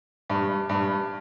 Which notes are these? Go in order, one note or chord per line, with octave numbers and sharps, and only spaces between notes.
G2
G2